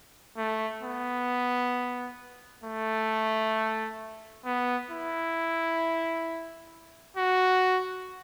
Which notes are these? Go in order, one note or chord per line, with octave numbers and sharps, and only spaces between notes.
A3
B3
A3
B3
E4
F#4